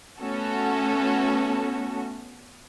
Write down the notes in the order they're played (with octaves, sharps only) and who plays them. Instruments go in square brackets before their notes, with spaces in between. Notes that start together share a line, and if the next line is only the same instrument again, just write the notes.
[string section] A3 B3 C#4 F#4 A4